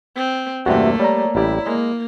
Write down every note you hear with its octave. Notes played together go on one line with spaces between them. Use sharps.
C4
E2 G2 C3 A3 A#3 F#4 G4 E5
G3 C#5 D5 A#5
A1 G3 E4 G4
G#3 A#3